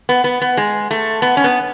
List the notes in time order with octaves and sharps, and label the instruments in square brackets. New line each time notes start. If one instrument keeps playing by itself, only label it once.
[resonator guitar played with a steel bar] B3
B3
B3
G#3
A3
B3
C#4
B3